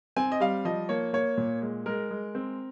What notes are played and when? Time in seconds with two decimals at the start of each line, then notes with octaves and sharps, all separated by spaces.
0.16 C4 G#5
0.32 D#5
0.40 G3 F5
0.65 F3 D#5
0.89 A#3 C#5
1.13 A#3 C#5
1.37 A#2
1.62 G#3
1.86 G#3 A#4
2.11 G#3
2.35 C4